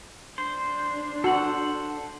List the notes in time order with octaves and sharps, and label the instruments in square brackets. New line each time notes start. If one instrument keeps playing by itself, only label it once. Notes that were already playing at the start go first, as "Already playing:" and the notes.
[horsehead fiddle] D4 [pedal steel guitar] C5
[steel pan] F#4 [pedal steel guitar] A4 C5 F#5